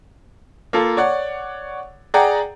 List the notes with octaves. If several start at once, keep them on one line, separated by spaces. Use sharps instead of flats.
A#3 F4 A4
C#5 D5 F#5
G#4 D5 F#5 G5 A#5